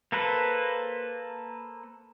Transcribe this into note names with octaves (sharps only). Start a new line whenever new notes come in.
A#3 A4 B4 C5